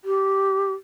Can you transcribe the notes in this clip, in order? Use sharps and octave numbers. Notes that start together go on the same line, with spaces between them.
G4